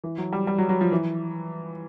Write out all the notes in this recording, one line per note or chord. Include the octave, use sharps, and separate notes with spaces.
E3
F#3
G3
G3
F#3
F#3
F3
E3